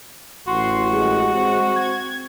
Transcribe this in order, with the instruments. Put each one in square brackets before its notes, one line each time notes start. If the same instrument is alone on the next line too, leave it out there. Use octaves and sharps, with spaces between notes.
[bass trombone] A1 [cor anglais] F#4 [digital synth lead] C6
[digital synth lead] G#3
[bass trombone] C4
[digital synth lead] G#6